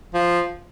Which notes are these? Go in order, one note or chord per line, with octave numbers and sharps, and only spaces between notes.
F3